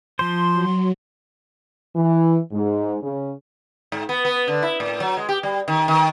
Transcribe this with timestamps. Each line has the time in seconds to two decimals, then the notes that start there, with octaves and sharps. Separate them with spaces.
0.19 F3 C5 C6
0.53 F#3
1.95 E3
2.52 G#2
3.02 C#3
3.92 G#2
4.09 B3
4.25 B3
4.48 D3
4.62 E4
4.80 A2
5.00 F#3
5.17 G#3
5.29 G4
5.43 G3
5.68 D#3
5.88 D#3